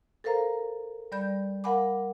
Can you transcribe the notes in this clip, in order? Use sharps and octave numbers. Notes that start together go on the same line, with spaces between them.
A4 A#4 C5 F5 A#5
G3 D5 B5 G6
A#4 F5 F#5 G#5 B5 D6